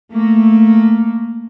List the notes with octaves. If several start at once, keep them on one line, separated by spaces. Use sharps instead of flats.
A3 A#3